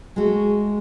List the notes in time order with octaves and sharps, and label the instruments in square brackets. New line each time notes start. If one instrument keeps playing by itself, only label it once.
[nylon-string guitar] G#3 A3 F#4